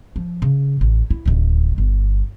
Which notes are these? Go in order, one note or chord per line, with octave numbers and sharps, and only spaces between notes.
F3
C#3
A1
E4
D1 D#2
G1